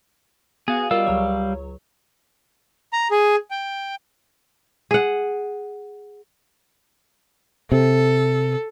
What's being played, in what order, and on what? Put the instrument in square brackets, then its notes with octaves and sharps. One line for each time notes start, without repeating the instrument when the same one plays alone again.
[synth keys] B3 F#4 F5 [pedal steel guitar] G#4
[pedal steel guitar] G3 F5 E6 [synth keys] F4 A#4 D#5
[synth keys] C#2 F#3 C#5
[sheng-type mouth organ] A#5
G#4
G5
[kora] G#4 F#5
[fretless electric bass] C3 [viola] A4